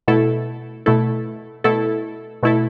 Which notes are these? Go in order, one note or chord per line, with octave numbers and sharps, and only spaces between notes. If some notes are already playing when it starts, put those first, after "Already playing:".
B2 A3 E4 A4
B2 A3 E4 A4
B2 A3 E4 A4
B2 A3 E4 A4